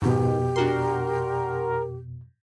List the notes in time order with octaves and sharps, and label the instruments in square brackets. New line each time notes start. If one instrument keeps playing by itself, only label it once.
[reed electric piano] F2 B2 [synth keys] G#2 D#3 [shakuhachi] G4
[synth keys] D4 F#4 C6 [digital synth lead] A#4